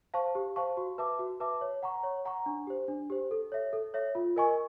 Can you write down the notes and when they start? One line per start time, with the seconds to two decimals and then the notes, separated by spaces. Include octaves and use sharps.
0.14 C5 F5 A5 C#6
0.35 G4
0.56 C5 F5 A5 C#6
0.77 F#4
0.98 B4 E5 A5 D6
1.19 F#4
1.40 B4 E5 A5 D6
1.61 C#5
1.83 F#5 A#5 C#6
2.03 C#5
2.25 F#5 A#5 C#6
2.46 D4
2.67 G4 C5
2.88 D4
3.10 G4 C5
3.31 A4
3.52 C#5 E5
3.73 A4
3.94 C#5 E5
4.15 F4
4.36 A#4 D#5 G#5 C#6